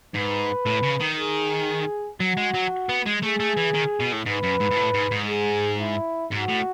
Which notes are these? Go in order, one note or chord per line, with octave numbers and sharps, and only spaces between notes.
G#2 B4
A2
C#3
D#3
G#4
F#3 F#4
G#3
F#3
B3
G#3
A3 G#4
A3
E3
D#3
B2
A2
G#2 B4
F#2
G#2
G#2
A2
G#2
G#2
G#4
E4
G#2 F#4
A2